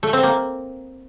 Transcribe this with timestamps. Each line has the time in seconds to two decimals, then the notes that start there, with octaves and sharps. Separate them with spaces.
0.03 A3
0.13 C4
0.23 A#3